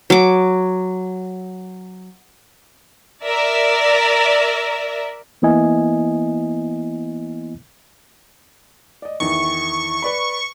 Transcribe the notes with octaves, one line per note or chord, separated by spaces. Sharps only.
F#3 D6
A#4 D5 E5
E3 A#3 B3 E4 D#5 G#5
D5 D#5
E2 D#3 E3 C#6
B4 D5 B5